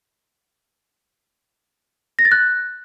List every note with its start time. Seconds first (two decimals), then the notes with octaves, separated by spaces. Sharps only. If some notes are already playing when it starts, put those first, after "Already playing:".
2.19 A#6
2.25 A6
2.32 F#6